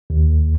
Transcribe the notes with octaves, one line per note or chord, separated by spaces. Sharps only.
D#2